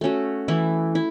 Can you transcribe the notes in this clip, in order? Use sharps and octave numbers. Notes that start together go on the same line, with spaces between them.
A3 C#4 F#4
E3 A3 E4
E4